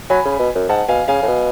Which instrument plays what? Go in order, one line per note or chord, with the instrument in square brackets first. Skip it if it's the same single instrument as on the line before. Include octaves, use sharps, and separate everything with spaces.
[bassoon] F#3 [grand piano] G#5 B5
[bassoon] C#3
B2
F#2
[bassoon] G#2 [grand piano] F#5 A5
[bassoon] B2 [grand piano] F5 G#5
[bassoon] C#3 [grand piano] F5 G#5
[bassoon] A2
B2